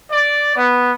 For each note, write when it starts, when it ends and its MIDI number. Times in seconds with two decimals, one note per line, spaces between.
0.11 0.56 74
0.56 0.91 59